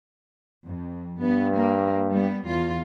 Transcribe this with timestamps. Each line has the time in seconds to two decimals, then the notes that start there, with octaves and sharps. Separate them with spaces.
0.64 F2
1.21 G2 B3
1.56 A#3
2.12 G3 B3
2.48 E2 F4